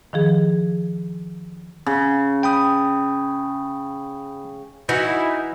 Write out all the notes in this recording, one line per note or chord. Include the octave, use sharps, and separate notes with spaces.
D#3 F3 G#4
C#3
G5 B5 D#6
E3 D#4 E4 F#4